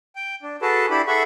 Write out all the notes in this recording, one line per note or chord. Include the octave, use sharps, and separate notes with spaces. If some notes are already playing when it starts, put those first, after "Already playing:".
G5
D4
F#4 G#4 A4 B4 A5
D4 E4 G4 B5
G#4 A4 E5 F#5 B5 C#6